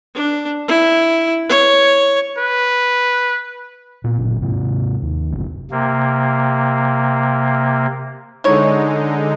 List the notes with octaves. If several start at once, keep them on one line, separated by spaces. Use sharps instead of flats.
D4
E4
C#5
B4
A#2 B3
G1 A#2
G#2 C3
D#2
D1 G1 F#2 C3
C3 A#3
D3 G#3 D#4 E4 C#5